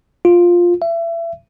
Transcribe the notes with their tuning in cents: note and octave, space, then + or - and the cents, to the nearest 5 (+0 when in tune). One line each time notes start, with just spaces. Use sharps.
F4 +5
E5 +30